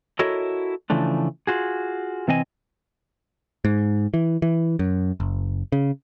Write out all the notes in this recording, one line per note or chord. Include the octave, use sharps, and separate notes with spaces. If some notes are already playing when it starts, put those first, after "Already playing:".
E4 F#4 A4 A#4 C#5 D#5
C#3 E3 F3 A3 D4
F4 F#4 G#4
C3 E3 C4 D#5 G#5
G#2
E3
E3
F#2
F#1
C#3